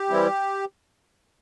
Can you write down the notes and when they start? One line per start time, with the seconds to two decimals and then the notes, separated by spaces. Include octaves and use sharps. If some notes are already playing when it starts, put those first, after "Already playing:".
Already playing: G4
0.09 E3 G3 C4 E4